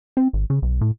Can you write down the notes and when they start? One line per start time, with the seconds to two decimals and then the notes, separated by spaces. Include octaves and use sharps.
0.17 C4
0.33 G#1
0.50 C#3
0.62 B1
0.81 A2